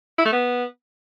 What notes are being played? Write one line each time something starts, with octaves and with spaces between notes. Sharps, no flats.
E4
A3
B3